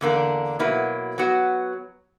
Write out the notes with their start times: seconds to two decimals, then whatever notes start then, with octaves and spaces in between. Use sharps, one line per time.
0.01 E2 D3 A#3 D4
0.59 B2 F#3 A#3 E4 B4
1.18 F#3 B3 F#4